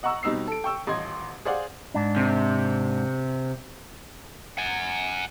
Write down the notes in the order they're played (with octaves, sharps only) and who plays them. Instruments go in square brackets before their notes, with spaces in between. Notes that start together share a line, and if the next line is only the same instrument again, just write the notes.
[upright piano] D#5 F#5 A#5 C#6 E6
B2 G3 C4 D#4 E6 C7
A4 D7
G5 C#6 E6
D#1 A1 D#5 C6 G#6
G#4 C5 D5 F5 F#5
[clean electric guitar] G#2 D4
[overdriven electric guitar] C3
[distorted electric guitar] F#5 G#5